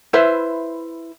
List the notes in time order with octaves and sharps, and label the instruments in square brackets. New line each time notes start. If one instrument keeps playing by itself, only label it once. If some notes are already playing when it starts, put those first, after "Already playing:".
[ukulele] E4 B4 C5 E5